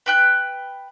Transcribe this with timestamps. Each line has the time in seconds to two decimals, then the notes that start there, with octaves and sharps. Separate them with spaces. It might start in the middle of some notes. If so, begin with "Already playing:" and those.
0.06 B4 G5 F#6